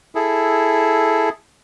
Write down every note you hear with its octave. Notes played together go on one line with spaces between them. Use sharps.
E4 G#4 A4